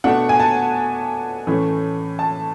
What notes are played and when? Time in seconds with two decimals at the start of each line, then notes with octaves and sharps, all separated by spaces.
0.04 B2 A3 D4 F#5
0.29 G#5
0.40 A5
1.47 A2 E3 A3 C#4
2.19 A5